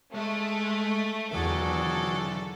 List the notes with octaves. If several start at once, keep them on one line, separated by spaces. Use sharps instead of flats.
G#3 A3
E2 D3 D#3 F#3 F#4 G#4 A4 D5